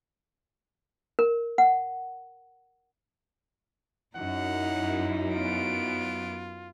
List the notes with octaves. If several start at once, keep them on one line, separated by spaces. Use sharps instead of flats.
A#4
F#5
F#2 D#4 E4 F#5
B3 F4 D7